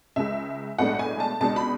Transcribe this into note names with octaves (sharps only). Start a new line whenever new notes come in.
C#2 C#3 G#3 E5
B1 A2 G#3 B3 D4 F#5
G#5
A5
C#2 B2 G#3 D4 A5
B5